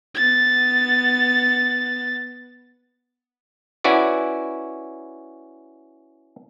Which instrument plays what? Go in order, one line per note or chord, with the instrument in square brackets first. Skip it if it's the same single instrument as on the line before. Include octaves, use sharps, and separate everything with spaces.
[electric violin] B3 A6
[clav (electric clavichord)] C#4 E4 F#4 B4 D5